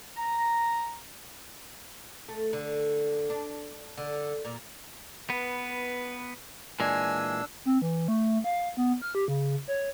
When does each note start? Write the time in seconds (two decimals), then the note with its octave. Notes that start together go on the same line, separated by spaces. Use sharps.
0.17 A#5
2.29 A3
2.53 D3
3.30 D4
3.98 D3
4.45 A#2
5.30 B3 B4
6.80 A#2 E3 G#3 D4 G#5 E6
7.65 C4
7.82 E3
8.08 A3
8.44 F5
8.77 B3
9.02 F6
9.15 G4
9.28 C#3
9.68 C#5